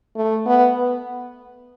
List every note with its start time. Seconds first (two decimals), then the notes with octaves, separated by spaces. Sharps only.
0.16 A3
0.46 B3